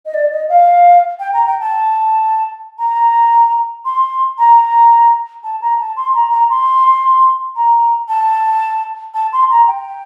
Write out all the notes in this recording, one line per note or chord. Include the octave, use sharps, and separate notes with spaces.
D#5
D5
D#5
F5
G5
A#5
G5
A5
A#5
C6
A#5
A5
A#5
A5
C6
A#5
A#5
C6
A#5
A5
A5
C6
A#5
G5